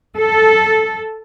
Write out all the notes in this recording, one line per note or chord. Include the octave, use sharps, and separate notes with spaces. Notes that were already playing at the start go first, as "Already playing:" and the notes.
A4